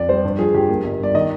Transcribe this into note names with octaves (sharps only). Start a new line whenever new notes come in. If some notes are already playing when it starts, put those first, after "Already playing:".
Already playing: F2 D5
G3 C5
G2
F3 G#4
G2 G4
A#3
G1
G2 D5
D#3 D#5